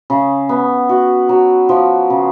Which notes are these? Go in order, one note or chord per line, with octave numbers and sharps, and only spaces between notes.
C#3
B3
F#4
F#3
F3
C#3